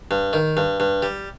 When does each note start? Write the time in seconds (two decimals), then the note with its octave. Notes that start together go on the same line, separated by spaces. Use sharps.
0.11 G2
0.33 D#3
0.57 G2
0.80 G2
1.03 G3